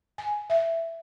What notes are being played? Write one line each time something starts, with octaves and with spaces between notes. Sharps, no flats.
G#5
E5